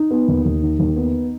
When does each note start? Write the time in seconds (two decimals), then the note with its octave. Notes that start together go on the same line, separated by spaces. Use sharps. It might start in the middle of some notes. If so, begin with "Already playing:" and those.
Already playing: D#4
0.11 B3
0.28 D#2
0.45 D#2
0.62 D#3
0.79 D#2
0.97 B3